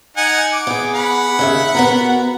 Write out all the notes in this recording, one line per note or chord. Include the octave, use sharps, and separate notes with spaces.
D#4 F#5 G#5
D6
B3 G#4
F#5 B5
D#2 C#3 E5
B3 F#4 A#4